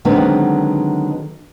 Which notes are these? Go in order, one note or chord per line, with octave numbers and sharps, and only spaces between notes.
D3 D#3 F#3 G#3 B3 C4